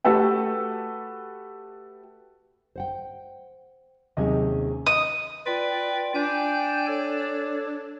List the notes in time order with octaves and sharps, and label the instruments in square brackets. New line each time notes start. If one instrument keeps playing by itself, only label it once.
[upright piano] A3 F#4 G4 A4 B4 G5
[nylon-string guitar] C5 F#5 G5
[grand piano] D#2 C3 D#5 [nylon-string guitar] F#3 C#4 G#4
[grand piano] D#5 [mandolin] D#6
[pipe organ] F4 D5 G5 [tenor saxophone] B4
[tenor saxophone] D4 [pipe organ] G5 G#5 G6
[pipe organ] A4 C#5